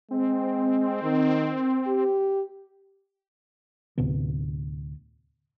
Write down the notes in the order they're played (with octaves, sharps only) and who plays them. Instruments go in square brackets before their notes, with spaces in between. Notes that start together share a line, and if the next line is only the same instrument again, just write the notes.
[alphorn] G#3 [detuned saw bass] C4
[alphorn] D#3
G4
[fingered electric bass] D2 A2 C3 B3